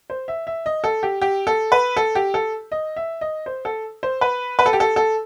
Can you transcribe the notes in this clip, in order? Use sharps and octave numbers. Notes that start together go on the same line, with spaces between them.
C5
E5
E5
D#5
A4
G4
G4
A4
B4
A4
G4
A4
D#5
E5
D#5
C5
A4
C5
B4
B4
A4
G4
A4
A4